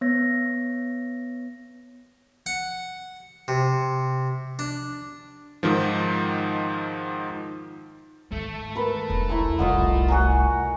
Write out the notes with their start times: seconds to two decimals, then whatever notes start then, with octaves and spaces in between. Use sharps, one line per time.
0.01 B3 C#5 A#6
2.46 F#5
3.48 C3
4.59 D4
5.63 G#2 D#3 F3
8.32 G#2 D#3 A3
8.75 A#4 B4
9.10 E1 B1
9.29 E4 A#5 E6
9.59 F1 C2 F4 D#5 F#5
10.08 F#4 G#5 A#5